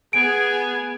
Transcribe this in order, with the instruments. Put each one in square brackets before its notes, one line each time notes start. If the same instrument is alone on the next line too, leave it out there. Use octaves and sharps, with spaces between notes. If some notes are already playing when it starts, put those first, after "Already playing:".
[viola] B3 G#4 [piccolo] G#5 [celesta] D7